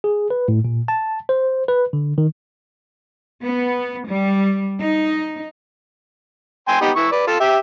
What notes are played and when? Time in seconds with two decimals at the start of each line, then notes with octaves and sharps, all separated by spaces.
0.04 G#4
0.30 B4
0.48 A2
0.65 A#2
0.88 A5
1.29 C5
1.68 B4
1.93 D3
2.18 D#3
3.44 B3
4.08 G3
4.79 D#4
6.68 G5 G#5 C6
6.81 B3 D#4 G4
6.96 E3 E4 C#6
7.12 B4 D5
7.27 F4 A4
7.40 G4 E5